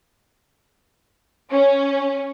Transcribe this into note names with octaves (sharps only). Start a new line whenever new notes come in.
C#4